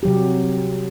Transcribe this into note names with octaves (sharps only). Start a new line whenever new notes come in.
C3 F#3 G4